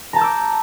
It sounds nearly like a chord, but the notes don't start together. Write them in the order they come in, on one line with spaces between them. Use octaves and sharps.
A#5 A5 G6 E6 D6